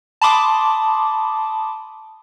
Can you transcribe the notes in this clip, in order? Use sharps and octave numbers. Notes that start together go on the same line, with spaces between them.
A5 B5 C6 D6 D#6